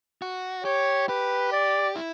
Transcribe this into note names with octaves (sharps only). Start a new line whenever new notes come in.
F#4
G4 C#5
G4 B4
D5
E4